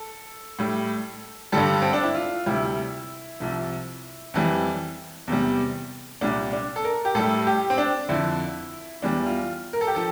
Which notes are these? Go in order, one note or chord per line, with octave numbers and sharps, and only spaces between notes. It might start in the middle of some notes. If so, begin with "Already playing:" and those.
Already playing: A4
A2 G3
G2 D3 G3 A4
C4
D4
E4
F4
D2 C3 G3 E4
C2 C3 F3
F2 E3 G3
E2 C3 G3
C2 A#2 G3 D4
D4
A4
A#4
G4
A2 G3 A4
G4
C4
D4
F2 D3 F3 E4
E2 E3 G3 D4
F4
A#4
A4
G4
F3 A4